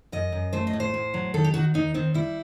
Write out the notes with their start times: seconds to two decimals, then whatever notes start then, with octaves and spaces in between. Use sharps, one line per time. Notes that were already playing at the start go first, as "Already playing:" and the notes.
0.12 F#2 D#5
0.32 F#2
0.53 A3 C5
0.67 D#5
0.73 A2
0.80 C5
0.94 A2
1.14 F#3
1.34 D#3 A4
1.44 G4
1.54 D#3 F#4
1.74 D#2 D#4
1.94 D#3 C4
2.14 G3 E4